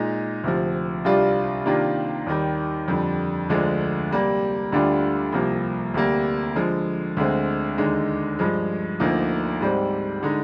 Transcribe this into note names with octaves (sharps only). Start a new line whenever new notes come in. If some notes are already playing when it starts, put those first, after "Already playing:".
Already playing: A#2 G#3 D#4
D2 C3 F3
C2 C3 G3 D4 F4
C3 D#3 A#3 D4 F4
D#2 D#3 G3
F2 D3 G3
D2 D3 F3 G#3 D4
C3 G3 A#3
D2 D3 G3 D4 F4
C2 C3 F3 A#3
D2 C3 G3 A#3
D3 F3 G#3
D2 D3 G#3 C4
D#2 D3 G#3 D#4
G2 F3 G#3
D2 D3 F3 A#3 D#4
G#2 G3 C4
D3 G#3 D#4